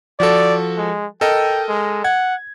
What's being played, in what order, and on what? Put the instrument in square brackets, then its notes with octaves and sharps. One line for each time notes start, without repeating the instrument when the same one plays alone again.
[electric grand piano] F3 F#4 A4 [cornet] D5
[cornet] G#3
[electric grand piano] A4 A#4 D#5 [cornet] G5
[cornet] G#3
[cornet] F#5 [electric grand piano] G#6